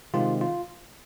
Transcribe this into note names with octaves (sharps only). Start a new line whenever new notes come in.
C3 D#3 G#3 C4 F4
F4